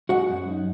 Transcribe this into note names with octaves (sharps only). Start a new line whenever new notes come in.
G#3 F#4 F#5
F#2
D#4